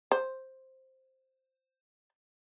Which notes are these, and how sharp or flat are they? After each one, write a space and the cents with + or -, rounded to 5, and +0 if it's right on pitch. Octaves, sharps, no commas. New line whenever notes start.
C5 +5